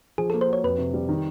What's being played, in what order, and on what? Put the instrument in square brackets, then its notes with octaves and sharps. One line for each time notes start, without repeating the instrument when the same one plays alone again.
[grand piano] F3 [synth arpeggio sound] G#4
[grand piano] A#3 [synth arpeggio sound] A4
[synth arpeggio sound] C5
[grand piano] F#4 [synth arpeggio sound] C#5
[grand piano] F2 [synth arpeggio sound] B4
[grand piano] C3
G3
D#3